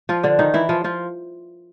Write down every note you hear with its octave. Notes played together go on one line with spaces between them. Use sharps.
F3 F4
D3 D4
D#3 D#4
E3 E4
F3 F4
F3 F4